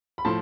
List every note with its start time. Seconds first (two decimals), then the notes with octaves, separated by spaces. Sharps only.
0.18 B5
0.25 A2 F3 A5 C6